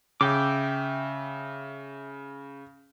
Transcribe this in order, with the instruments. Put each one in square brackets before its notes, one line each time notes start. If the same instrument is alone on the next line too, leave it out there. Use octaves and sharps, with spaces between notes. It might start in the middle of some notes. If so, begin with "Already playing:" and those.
[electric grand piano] C#3 [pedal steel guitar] E5 G5 D6